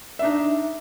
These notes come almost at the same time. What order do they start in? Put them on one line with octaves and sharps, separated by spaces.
E5 D4 D#4